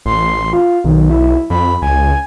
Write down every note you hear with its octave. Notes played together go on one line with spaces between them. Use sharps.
A1 C6
F4
B1 D#3
E4
F2 B5
C#2 G#5